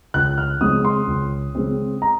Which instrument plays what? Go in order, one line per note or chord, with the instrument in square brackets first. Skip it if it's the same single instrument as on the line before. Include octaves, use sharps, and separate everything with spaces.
[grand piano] C#2 F#6
F6
C#3 G#3 C4 D#6
C6
C#2
C#3 G#3 C4
A#5